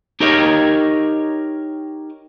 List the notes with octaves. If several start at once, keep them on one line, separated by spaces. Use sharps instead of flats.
D#4 G4 A#4 C#5 D#5 F5